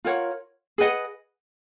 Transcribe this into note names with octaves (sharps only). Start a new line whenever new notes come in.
F4 A#4 C#5 F#5
G#4 B4 D#5 F#5